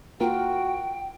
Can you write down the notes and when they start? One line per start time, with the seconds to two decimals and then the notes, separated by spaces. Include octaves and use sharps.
0.20 A#3 F4 F#4 A#4 G5